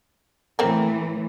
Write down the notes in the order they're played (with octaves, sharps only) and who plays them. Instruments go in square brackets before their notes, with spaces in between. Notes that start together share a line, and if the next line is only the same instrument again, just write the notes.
[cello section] A2 E3 A3 [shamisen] A#3 C4 A#4